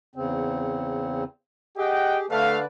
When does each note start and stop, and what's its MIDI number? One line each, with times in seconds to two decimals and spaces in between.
0.15 1.24 40
0.15 1.24 49
0.15 1.24 60
1.77 2.26 67
1.77 2.26 68
1.77 2.17 75
1.77 2.17 78
1.77 2.17 79
2.30 2.65 50
2.30 2.57 57
2.30 2.65 71
2.30 2.65 74
2.30 2.57 77